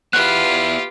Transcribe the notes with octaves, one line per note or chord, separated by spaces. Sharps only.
B3 E4 F4 G4 B4 F6 F#6